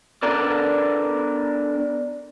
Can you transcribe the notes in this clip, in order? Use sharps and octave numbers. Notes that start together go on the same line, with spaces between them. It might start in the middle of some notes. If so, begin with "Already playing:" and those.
B3 D4 A4 A#4 D5